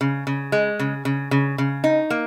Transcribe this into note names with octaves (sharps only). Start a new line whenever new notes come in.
C#3
C#3
G#3
C#3
C#3
C#3
C#3
D#4
A#3